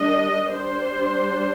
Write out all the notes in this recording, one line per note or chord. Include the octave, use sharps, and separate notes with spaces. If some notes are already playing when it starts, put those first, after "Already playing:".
Already playing: D#3 G3 D4 D#5
G3 D4 C5